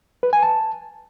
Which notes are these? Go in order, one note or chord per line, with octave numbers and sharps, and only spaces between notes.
B4
G#5
A5